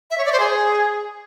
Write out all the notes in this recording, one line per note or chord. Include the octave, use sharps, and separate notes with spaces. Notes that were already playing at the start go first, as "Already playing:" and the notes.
E5
C#5
D5
C5
G#4